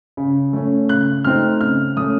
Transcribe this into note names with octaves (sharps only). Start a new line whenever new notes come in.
C#3
A3 C#4
C#3 F#6
A3 C4 D#4 F6
C#3 F6
A3 C#4 D#6